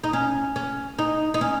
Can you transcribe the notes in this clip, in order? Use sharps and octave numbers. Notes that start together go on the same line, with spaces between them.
D#4
C#4
C#4
D#4
D#4
C#4